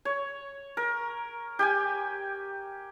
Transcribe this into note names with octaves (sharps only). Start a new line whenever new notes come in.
C#5
A#4
G4 G5 G#5